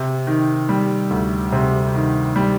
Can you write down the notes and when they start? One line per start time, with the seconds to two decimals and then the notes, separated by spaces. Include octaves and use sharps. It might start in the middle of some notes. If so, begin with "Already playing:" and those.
Already playing: C3
0.27 D#3
0.69 G3
1.10 D2
1.53 C3
1.95 D#3
2.36 G3